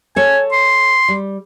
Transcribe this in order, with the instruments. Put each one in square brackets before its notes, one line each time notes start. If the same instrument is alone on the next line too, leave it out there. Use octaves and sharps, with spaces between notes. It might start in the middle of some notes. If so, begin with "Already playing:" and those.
[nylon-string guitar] A4 C#5 [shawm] G#5
[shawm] C6
[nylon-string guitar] G3